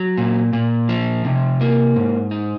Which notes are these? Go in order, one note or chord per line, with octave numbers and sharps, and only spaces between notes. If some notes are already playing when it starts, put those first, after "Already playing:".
Already playing: F#3
A#2
A#2
F3
C3
A#3
G#2
D#4